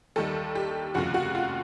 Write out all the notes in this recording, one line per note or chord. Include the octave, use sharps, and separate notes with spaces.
D#2 D#3 G3 A4
G4
F1 D#2 C#3 F3 F#4
F#4
F4